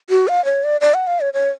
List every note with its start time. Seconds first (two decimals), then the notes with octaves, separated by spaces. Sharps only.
0.10 F#4
0.28 F5
0.45 C#5
0.64 D5
0.81 D5
0.94 F#5
1.07 F5
1.20 C#5
1.34 C#5